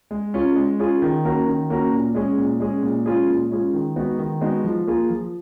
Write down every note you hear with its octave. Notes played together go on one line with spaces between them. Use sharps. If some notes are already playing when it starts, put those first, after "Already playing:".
G#3
C#4 F4 G#4
G#3
C#4 F4 G#4
D#3
A#3 C#4 F#4 A#4
D#3
A#3 C#4 F#4 A#4
A#2
G#3 C#4 G#4
A#2
G#3 C#4 G#4
A#2
G#3 C#4 F4 G#4
A#2
G#3 C#4 F4 G#4
D#3
G#3 B3 D#4 F#4
D#3
G#3 B3 D#4 F#4
F3
A#3 F4 G#4
F3